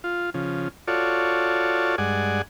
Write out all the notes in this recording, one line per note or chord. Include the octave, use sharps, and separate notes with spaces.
F4
C#3 F3
F4 F#4 A4 C#5 D5
G2 G#3 D5 F#5 G#5